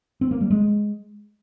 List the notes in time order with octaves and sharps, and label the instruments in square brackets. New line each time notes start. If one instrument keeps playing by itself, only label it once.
[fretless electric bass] C4
A#3
G3
G#3